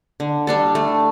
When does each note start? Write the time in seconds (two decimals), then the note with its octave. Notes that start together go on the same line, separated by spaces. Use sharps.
0.20 D3
0.47 G3 D4 A4
0.75 A3